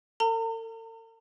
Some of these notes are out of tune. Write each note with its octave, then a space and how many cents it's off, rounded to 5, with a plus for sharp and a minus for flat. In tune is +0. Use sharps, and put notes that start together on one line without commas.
A4 +45 A#5 -45